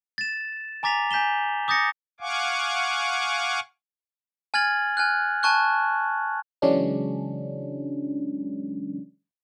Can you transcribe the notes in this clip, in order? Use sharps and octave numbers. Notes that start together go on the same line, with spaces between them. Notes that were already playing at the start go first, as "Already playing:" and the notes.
A6 E7
G#5 A#5 D6 A6 B6 F7
G#5 G6 B6 E7 G7
D6 D#6 G6 A6 A#6 C#7
F5 F#5 G#5 C#6 D6
G#5 F6 G#6 A6 F#7
G#5 F6 F#6
G#5 A5 C#6 F#6
C#3 E3 F#3 G#3 C#4 D4